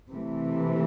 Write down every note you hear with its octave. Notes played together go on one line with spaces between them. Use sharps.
C3 E3 A3